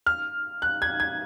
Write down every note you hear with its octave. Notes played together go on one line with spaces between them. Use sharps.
F6
F#6
G#6
G#6